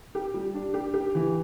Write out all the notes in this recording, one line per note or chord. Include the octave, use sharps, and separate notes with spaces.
G4
G3
D4
G4
G4
E3